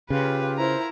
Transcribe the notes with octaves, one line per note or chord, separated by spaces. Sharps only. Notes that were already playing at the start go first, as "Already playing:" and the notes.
C#3 F4 G4 B4
E4 F4 A#4 C5 A#5